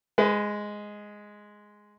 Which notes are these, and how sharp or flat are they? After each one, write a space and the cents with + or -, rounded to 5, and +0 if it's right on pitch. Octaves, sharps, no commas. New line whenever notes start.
G#3 +0 B4 +40